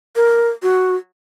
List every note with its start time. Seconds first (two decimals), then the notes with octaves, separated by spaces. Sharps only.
0.16 A#4
0.63 F#4